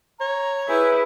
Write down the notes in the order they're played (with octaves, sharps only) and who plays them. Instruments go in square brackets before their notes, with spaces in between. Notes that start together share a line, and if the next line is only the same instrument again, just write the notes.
[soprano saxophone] C#5 [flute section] A#5
[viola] E4 G#4 [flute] B4 [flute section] G#5 E6 G6